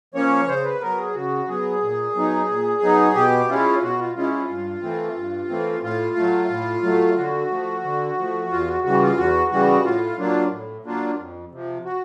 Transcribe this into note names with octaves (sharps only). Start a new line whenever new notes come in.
F3 A#3 C#4 C#5
C#3 C5
B4
F#3 B3 A#4
G#4
C#3 F#4
F#3 B3 G#4
A#2
F#3 B3 D#4
A#2
F#3 B3 D#4
B2 G4
G#3 C#4 E4 F4
B2 F#4
F4
G#3 C#4 E4 F4
F4
G2
E3 A3 C4
G2
E3 A3 C4
A2 F4
F#3 A3
A2
F#3 A3
D3 F#4
F3 A3
D3
F3 A3
E2 F4
F#4
C#3 E3 G3 F#4
F4
E2 F#4
C#3 E3 G3 F#4
A2 F4
F#3 A#3 D4 F4
A2
F#3 A#3 D4 F4
F2
C3 F3
F#4